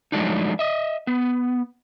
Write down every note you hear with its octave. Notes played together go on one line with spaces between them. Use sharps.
F3 F#3 G#3 A3 D4 D#4
D#5 E5
B3